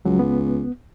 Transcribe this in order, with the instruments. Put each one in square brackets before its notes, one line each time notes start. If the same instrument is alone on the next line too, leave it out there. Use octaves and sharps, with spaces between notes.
[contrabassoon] C#2 [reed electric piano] F#3
[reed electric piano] B3